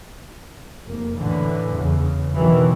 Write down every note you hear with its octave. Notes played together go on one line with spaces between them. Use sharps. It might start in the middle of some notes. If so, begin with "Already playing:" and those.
F1 A#3
A2 D3 E3
E2 C#3
B2 D#3 E3 F#3